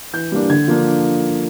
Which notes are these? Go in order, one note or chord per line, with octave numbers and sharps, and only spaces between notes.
E3 G6
G3 A#3 D4
D3 G#6
F3 A#3 D4